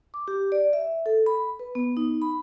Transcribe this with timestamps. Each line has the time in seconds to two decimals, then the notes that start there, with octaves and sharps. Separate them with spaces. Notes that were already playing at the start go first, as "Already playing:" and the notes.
0.14 D6
0.28 G4
0.52 D5
0.73 E5
1.06 A4
1.26 B5
1.59 B4
1.75 B3
1.97 D#4
2.22 B5